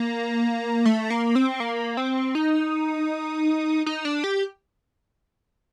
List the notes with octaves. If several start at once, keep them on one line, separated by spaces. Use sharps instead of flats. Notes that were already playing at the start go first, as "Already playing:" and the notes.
Already playing: A#3
A3
A#3
C4
A#3
C4
D#4
D#4
D4
G4